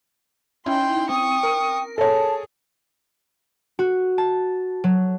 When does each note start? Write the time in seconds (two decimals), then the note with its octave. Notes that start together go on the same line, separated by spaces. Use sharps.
0.66 C#4 D#4 E4 G5 C6
1.09 C4 G5 C#6 D#6
1.43 A#4
1.98 G#4 A4 C#5 A5
3.79 F#4
4.18 A5
4.84 F#3